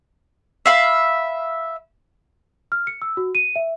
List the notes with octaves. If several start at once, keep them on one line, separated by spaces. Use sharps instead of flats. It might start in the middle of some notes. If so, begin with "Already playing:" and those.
E5 F5 B5
F6
C#7
E6
F#4
D#7
E5